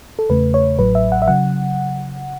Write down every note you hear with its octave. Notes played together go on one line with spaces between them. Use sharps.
A4
E2 C#3 A3 B4
C#5
A1 A2 F#3 B4
E5
F#5
E5
C#3 F#3 F#5